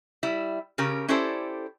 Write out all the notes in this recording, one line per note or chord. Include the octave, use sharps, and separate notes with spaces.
G3 E4 E5
C#3 C#4 G4 A#4
C#4 E4 G4 A4 C5 D5